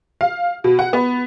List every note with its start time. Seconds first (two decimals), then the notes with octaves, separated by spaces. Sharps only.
0.21 F5
0.64 B2
0.79 F#5
0.93 B3